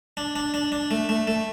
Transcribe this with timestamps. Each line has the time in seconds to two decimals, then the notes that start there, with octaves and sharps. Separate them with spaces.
0.17 D4
0.36 D4
0.54 D4
0.72 D4
0.91 A3
1.09 A3
1.27 A3